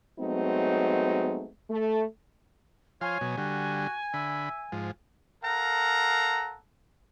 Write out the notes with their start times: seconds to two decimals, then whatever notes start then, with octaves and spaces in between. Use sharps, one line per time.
0.19 F#3 G#3 A3 B3 C4 D#4
1.70 A3
3.01 F3 C#5 F5 G#5 C6
3.21 B2 F#3
3.37 D3 G3 F#4
4.14 D3 E5 B5
4.72 G#2 F3
5.44 A4 A#4 F5 F#5 A#5